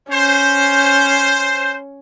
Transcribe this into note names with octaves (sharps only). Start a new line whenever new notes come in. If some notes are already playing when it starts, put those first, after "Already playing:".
C#4 C5